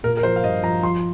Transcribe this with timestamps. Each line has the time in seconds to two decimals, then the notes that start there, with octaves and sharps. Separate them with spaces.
0.03 A#2 A#4
0.17 A#4
0.23 F3 C5
0.36 F5
0.43 G2 D#5
0.63 F3 A#5
0.83 F3 C6